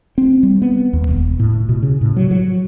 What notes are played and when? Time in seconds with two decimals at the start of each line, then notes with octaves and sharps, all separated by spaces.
0.18 C4
0.43 G3
0.62 B3
0.93 D#2
1.09 E1
1.40 A2
1.69 B2
1.82 C#3
2.01 A2
2.17 F#3
2.31 F#3